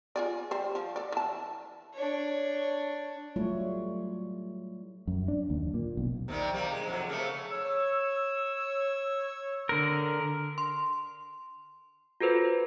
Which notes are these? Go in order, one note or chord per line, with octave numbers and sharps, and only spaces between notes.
F4 G#4 D5
G3 C5
F3
A4 D5
E3 A5
D4 C#5
F#3 G3 A3 E4 F4 C#5
F#2
D4
D#2
A#2
B1
C3 D#3 G3
C3 G3 A#3
G#3
F2 C3 F#3
C#3 A3 A#3
C#5 E6
D3 A#4
C6
F4 F#4 A4 B4 C5